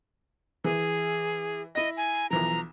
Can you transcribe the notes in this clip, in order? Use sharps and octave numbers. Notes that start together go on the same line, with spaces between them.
E3 G#4
E4 D#5 A#6
G#5
B1 E3 F3 A#5